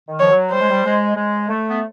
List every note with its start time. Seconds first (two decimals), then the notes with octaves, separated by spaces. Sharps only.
0.09 D#3
0.19 F3 C#5
0.31 F#3
0.51 G3 C5
0.61 G#3
0.70 G3
0.85 G#3
1.16 G#3
1.49 A3
1.69 B3